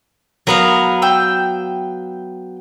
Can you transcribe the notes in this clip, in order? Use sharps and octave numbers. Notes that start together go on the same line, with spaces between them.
F#3 B3 A#4 F5
G5 E6